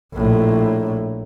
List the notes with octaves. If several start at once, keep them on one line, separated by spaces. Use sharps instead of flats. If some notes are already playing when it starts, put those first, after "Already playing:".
A#1 A2